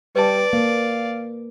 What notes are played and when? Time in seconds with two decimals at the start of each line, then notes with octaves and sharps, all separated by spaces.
0.16 G3 B4 D5 A5
0.53 A#3 F5